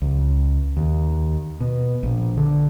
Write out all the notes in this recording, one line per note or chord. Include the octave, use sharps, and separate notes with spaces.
C#2
D#2
B2
A#1
D3